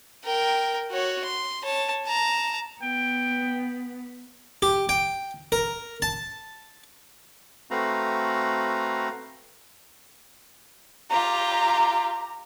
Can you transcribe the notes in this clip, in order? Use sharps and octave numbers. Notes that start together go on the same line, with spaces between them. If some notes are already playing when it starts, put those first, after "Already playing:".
A#4 G5
F#4 C#5
C6
C#5 A5
A5 A#5
B3 G5
G4
G5
A#4
A5
A3 C4 F#4 B4 F5 A#5
F4 G4 A#5